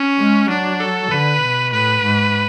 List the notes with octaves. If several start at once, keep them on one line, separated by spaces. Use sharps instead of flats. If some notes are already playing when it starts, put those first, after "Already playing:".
Already playing: C#4
G#3
F#3 D4
A4
D3 B4
B2
A2 B4
G#2